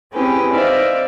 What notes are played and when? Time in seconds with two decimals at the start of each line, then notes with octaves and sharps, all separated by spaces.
0.14 C4 C#4 E4 G4 G#4 B4
0.53 D#4 C5 D5 E5 F5